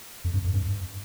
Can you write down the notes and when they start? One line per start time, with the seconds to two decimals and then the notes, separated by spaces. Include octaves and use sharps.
0.24 F2
0.34 G2
0.44 F2
0.53 G2